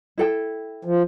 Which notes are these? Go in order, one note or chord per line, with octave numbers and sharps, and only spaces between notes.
E4 A4 G5
F3